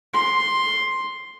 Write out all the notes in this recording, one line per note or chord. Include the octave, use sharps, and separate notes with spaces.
C6